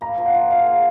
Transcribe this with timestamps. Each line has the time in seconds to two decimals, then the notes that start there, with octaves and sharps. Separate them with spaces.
0.01 A#3 A#5
0.18 F3
0.26 F#5
0.34 F4
0.50 G#4 F5
0.66 A#3